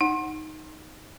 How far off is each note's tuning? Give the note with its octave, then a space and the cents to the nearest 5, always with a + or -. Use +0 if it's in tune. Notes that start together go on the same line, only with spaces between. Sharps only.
D#4 +0 F#5 +0